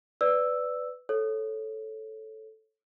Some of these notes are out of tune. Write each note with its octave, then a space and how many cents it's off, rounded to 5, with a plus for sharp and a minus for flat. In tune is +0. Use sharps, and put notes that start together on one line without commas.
B4 +15 D5 +0 E6 +0
A4 -5 C#5 -15